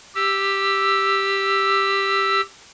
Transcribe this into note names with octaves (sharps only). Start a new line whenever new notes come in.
G4 E6